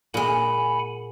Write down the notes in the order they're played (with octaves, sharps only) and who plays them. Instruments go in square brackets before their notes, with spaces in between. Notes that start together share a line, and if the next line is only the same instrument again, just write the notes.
[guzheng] A#2 G#3 [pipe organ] F#5 G#5 B5